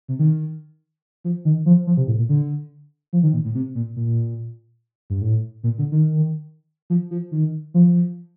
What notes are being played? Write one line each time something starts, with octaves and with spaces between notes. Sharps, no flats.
C3
D#3
F3
D#3
F3
F3
C3
A2
A#2
D3
F3
D#3
A#2
A2
C3
A#2
A#2
G2
A2
A#2
D3
D#3
F3
F3
D#3
F3